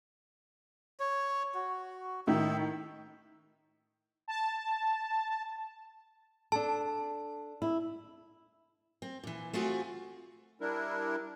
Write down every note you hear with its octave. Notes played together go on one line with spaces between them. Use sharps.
C#5
F#4
A2 D#3 D#4 E5
A5
D4 A4 A5
E4
C4
A#2 E3
A3 C4 F4 F#4 G#4
G3 D4 E4 A#4